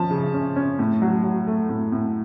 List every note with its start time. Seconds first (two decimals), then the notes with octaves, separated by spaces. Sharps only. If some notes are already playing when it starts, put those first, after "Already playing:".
Already playing: F3 C#4 A5
0.11 C#3
0.34 C#4
0.56 C#4
0.79 A2
1.02 F#3
1.24 F#3
1.47 A3
1.69 A2
1.92 A2